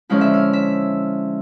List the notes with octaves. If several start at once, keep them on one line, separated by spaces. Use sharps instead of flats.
D3 F3 G#3 C#4 E4 F5
E5
F5
E5